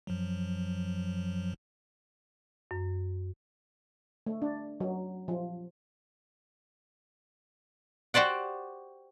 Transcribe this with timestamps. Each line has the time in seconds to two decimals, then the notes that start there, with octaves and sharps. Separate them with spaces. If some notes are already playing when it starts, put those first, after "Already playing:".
0.07 F#2 F3 F#3
2.71 F#2
4.26 A3
4.42 D4
4.80 F#3
5.28 F3
8.14 F#4 G4 C5 D5 F#5